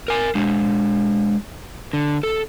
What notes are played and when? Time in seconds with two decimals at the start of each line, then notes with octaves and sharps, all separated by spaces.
0.08 A#4 G#5
0.35 G#3 D4
1.93 D3
2.23 A4